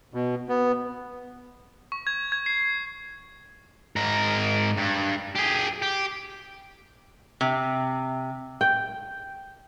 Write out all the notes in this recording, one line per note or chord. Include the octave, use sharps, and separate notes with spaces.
B2
B3
C#6
G#6
G#6
C7
G#2 A#4
G2
G4 G#4
G4
C3
G5